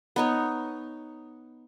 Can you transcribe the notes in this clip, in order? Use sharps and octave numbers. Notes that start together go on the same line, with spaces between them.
B3 D#4 C#5